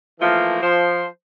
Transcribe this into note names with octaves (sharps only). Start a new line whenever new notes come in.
E3 F3 A3 A#3
F3 C5